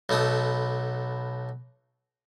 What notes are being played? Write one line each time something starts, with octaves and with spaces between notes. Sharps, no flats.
B1 B2 A3 D#6